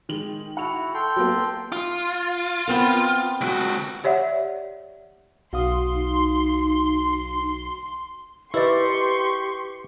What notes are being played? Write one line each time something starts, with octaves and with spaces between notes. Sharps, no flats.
D#3 G#3 F#7
E4 F#4 F#5 F7
A4 G5 C6
F#3 A#3 B3
F4
B3 C4 A#4
C#2 F#4
G4 C#5 D5 E5 F#5
B1 F#4 F5 C6 D#6
D#4
E4 G4 A#4 B4 D5 D#5 C6 C#6